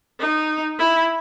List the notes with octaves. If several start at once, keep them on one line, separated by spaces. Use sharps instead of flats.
D#4
E4